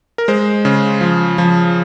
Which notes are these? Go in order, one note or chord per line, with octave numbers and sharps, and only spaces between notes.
A#4
G#3 C5
C#3
F3
F3